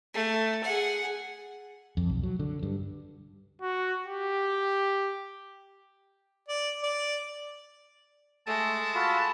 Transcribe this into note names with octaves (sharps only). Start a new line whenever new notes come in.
A3
G#4 F#5
F2
B1
F#3
D3
G2
F#4
G4
D5
D5
G#3 A3 A4 A5
F4 F#4 A4 B5